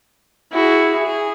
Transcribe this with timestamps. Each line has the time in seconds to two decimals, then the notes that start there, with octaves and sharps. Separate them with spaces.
0.53 E4 F#4 G#4
1.02 G#4